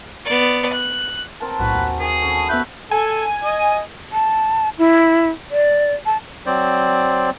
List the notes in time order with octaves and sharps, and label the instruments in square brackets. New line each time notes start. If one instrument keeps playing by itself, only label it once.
[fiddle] B3 D5
F#6
[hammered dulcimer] C4 A#4 A5
[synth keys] B1 A2 [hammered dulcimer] F#4 [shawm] B4
[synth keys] D#2 G#5
[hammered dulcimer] D#3 [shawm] G#4
[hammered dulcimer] C#4 A4 B5
[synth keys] B3 E6 G6 [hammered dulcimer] E4 C#5 E5 [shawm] B4
[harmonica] A4 [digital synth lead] G#5
[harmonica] D#5
[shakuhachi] A5
E4
D5
A5
[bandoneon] F#3 C4 C5 D5